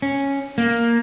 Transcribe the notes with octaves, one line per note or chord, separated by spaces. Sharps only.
C#4
A#3